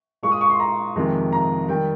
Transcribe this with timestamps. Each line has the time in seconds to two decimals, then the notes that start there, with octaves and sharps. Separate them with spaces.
0.23 A#2 G#3 C#6
0.32 D#6
0.41 C#6
0.50 C6
0.60 A#5
0.96 F2 C3 D#3 G#3
1.33 A#5
1.68 D#3 G3 G5